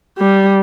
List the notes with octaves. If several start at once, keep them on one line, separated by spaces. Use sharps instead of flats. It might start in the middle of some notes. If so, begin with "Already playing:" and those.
G3